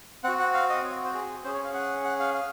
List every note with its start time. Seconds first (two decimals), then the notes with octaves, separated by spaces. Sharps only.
0.24 C4 F#4 F#5
0.39 F#5
0.54 F5
0.69 D#5
0.84 C#5
1.04 C5
1.14 G#4
1.44 C#4 G#4 C5
1.54 C#5
1.64 F5
1.74 F#5
2.04 F#5
2.19 F5
2.34 F5